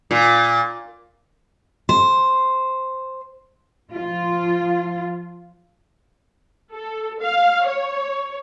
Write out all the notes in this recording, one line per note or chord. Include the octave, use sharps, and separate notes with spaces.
A#2
C5
F3 F4
A4
F5
C#5